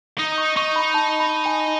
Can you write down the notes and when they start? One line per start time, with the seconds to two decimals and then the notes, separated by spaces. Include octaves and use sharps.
0.19 D#4 D#6
0.32 D#6
0.38 C#6
0.57 D#4 C#6
0.76 B5
0.94 A5
1.20 B5
1.46 G#5